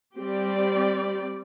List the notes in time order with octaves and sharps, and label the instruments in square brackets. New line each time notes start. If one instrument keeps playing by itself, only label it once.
[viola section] G3 C4 G4 D5